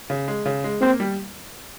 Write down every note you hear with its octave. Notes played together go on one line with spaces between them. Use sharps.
C#3
G#3
C#3
G#3
A#3 C4
G3